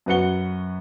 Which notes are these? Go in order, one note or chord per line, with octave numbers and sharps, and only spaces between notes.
F#2 F#4 B4 F#5 C#7 G7